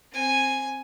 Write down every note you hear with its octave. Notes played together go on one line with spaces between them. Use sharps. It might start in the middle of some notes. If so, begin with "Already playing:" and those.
C4 G#5